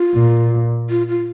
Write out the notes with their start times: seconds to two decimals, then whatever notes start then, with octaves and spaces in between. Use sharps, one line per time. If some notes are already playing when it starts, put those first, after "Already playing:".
Already playing: F4
0.14 A#2
0.90 F4
1.09 F4